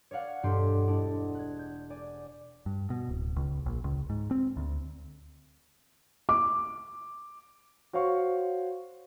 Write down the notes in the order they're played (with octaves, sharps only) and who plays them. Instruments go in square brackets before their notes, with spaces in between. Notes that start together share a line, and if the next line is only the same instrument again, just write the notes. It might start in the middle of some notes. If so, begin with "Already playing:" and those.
[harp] C#5 D5 F5 F#5
E1 G2 G4 A4 C6 C7
G#3 D4 E4
F#6 G#6
G6
D5 G#5
[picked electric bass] G2
B2
D1
C#2
A#1
C#2
G#2
C4
D2
[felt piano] D6
[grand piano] F#4 C5 C#5 F5 C#6